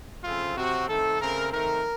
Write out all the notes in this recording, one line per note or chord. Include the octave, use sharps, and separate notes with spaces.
C#3 F3 A3 C4 F4
C3 F#3 C4 F#4
D#3 A3 C4 A4
C#3 A3 C4 A#4
D#3 A3 C4 A#4